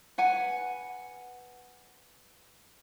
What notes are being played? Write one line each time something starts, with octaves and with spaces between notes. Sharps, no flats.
B4 F#5 G#5